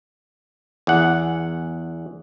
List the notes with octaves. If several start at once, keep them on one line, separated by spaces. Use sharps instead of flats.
E2 F#5